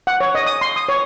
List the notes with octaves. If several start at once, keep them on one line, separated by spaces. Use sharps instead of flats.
F#5
C#5
D#5
D#6
C6
D#6
C#5